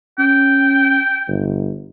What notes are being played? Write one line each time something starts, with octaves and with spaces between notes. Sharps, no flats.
C#4 G5
G1